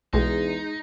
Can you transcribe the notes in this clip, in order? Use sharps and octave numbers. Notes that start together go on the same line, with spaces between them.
B1 E2 G#3 D#4